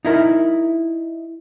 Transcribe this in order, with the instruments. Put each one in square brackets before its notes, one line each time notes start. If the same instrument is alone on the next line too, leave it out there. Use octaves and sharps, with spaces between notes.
[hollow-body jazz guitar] D#4 E4 A#4